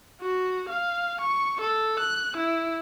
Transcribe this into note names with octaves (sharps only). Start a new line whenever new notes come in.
F#4
F5
C#6
A4
F#6
E4